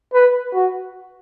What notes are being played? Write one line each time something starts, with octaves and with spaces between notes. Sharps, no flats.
B4
F#4